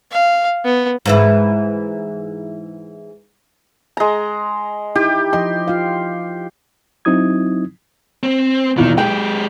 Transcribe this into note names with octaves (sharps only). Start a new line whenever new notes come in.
F5
B3
G#2 E3 E4
G#3 A#5
D#4 E4 G4
F3 D#5 C6
F4 F5
F#3 C4 D#4 E4 D#6 G#6
C4
B1 E2 A#2 D#3
G#3 G4 G5